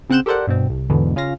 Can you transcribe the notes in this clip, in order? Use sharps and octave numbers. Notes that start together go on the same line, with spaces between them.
C#3 C4 F#5 F#6 G6 E7
G4 A4 A#4 C5 D5 F#5
G2 B2 C4
C2
E2 G#2 B2 D3 E3
C#3 C#4 F4 F5 A#6